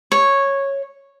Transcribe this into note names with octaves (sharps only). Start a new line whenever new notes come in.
C#5